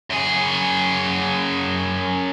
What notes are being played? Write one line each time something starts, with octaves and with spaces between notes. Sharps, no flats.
F#2 G#4